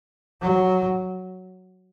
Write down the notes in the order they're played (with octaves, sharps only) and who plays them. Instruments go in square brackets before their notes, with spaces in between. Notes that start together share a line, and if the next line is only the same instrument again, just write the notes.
[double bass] F#3